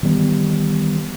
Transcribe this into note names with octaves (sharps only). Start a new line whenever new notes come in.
D#3 E3 G3 B3